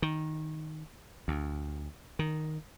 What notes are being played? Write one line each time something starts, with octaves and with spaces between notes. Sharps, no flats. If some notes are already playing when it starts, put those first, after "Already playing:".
D#3
D2
D#3